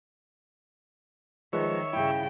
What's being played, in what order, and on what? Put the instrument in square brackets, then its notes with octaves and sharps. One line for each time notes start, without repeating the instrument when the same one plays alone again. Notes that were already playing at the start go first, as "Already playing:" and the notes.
[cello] D#3 [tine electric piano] F3 G#3 B4 [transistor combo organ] C#5 E5
[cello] G2 C#3 [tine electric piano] E4 [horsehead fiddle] G5